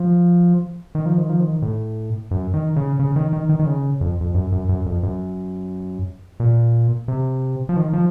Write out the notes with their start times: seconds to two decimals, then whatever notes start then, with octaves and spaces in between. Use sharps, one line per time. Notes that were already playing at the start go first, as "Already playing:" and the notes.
Already playing: F3
0.95 D#3
1.06 F3
1.18 D#3
1.29 F3
1.40 D#3
1.62 A2
2.31 F#2
2.54 D#3
2.76 C#3
2.99 C#3
3.16 D#3
3.33 D#3
3.49 D#3
3.60 D#3
3.66 C#3
4.01 F2
4.21 F2
4.35 F#2
4.52 F#2
4.69 F#2
4.86 F2
5.03 F#2
6.40 A#2
7.08 C3
7.69 F3
7.76 D#3
7.93 F3